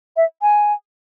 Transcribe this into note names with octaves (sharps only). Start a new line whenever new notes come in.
E5
G#5